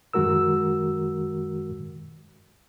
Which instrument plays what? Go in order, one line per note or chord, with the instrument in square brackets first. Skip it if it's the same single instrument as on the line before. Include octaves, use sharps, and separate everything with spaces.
[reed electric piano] F#2 D#3 G#3 F#4 A#4 E6